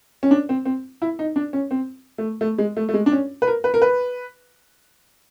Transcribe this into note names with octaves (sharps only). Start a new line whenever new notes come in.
C#4
D4
C4
C4
E4
D#4
D4
C#4
C4
A3
A3
G#3
A3
A3
G#3
D4
C#4
B4
A#4
B4
A#4
B4